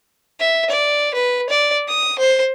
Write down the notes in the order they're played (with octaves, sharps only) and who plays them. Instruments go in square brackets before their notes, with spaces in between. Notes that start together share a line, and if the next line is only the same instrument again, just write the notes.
[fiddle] E5
D5
B4
D5
D#6
C5